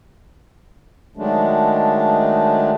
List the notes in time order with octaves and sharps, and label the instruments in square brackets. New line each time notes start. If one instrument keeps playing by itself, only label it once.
[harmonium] D#3 F#3 G#3 A3 D4